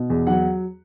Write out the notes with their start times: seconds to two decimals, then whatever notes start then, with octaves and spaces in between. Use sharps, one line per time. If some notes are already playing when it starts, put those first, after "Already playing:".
Already playing: B2
0.10 E2
0.27 F#3 F#5